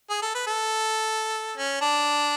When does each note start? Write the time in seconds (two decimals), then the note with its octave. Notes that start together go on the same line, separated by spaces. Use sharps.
0.10 G#4
0.22 A4
0.34 B4
0.47 A4
1.57 C#4
1.81 D4